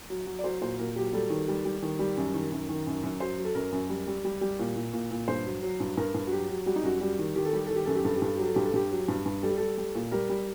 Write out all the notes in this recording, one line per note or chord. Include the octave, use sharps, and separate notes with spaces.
F#3
F#3
D5
F#3 C5
A#2 C5
A#2 A#4
F#3 G4
G3 A4
D#3
G3
G3
D#3
G3
F#2
D#3
F#2
D#3
F#2
F#2
F#3 C5
F#3
A4
F#2 A#4
F#2
G3
G3
G3
G3
A#2
A#2
A#2
A#2
G2 C5
F#3
F#3
G2
G2 A#4
G2
F#4
F#3 G4
F#3
G3 F#4
D#4
F#2 F#4
G3
D#3
D#3 G4
A4
G3 G4
D#3 A4
G4
F#2 A4
G4
G2 A4
G4
G2 A4
F#3 G4
A4
G2 G4
A4
G2 G4
F#3
G2
G2
G3 A4
G4
G3 A4
G3
A#2
G3 A#4
G3